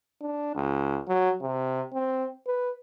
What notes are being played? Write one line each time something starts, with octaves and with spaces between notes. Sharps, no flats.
D4
C#2
F#3
C3
C4
B4